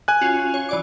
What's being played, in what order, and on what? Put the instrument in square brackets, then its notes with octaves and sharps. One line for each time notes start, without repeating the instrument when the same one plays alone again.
[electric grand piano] G#5 F#6
[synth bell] C#4 F4 F#4
C#5
E3 D5 D6